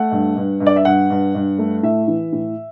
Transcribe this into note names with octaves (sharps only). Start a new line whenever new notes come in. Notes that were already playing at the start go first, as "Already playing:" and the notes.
Already playing: A3 F#5
G2
G2
G2
D5
E5
G2 F#5
G2
G2
A3
A2 E5
E3
A2